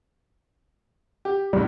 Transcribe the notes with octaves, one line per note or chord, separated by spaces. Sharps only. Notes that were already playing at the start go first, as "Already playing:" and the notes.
G4
C#2 A2 G3